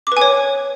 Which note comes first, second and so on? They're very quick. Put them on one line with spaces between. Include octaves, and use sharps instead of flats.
D6 B4 G#5 C#5